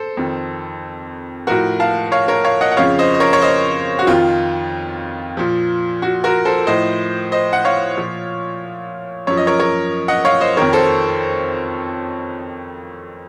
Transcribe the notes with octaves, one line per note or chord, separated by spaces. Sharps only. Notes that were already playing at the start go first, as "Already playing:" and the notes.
Already playing: A4 C5
F2 D#3
A2 F3 F#4 A#4
F5 A5
C#5 F5
A#4 C#5
C#5 F5
D#5 F#5
F#5
F2 C#3 F3 C#5 F5
C5 D#5
D#5
A#4 C#5
C#5
C5 D#5
F#4
F2 D#3 F4
A#2 F3
F#4
F#4 A#4
A4 C5
A2 F3 C5 D#5
C5 D#5
F#5
C#5 F5
A#2 F3
F#2 F3 C#5
D#5
A#4 C#5
A#4 C#5
D#5 F#5
C#5 F5
C5 D#5
F2 D#3 A#4 C#5
A4 C5